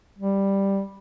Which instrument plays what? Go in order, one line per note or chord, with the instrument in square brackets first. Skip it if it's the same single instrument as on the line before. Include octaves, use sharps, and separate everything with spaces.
[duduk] G3